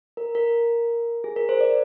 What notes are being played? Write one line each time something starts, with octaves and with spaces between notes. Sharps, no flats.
A#4
A#4
G#4
A#4
C5
D5